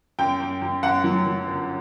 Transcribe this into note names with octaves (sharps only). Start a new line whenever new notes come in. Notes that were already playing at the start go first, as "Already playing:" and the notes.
F#2 G5
F#2
F#2
F#2 F#5
F#3
F#3
G1